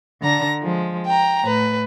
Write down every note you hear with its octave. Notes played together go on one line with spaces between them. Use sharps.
D3 A#5 A#6
F3 G#3
G5 A#5
A2 B4